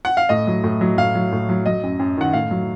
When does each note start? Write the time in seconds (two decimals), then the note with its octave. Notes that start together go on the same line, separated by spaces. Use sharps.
0.05 F#5
0.17 F5
0.29 A2 D#5
0.47 F#3
0.64 A2
0.81 F#3
0.98 A2 F5
1.15 F#3
1.32 A2
1.49 F#3
1.66 F#3 D#5
1.84 F#2
1.99 F#2
2.18 D#3 F#5
2.33 A2 F5
2.51 F#3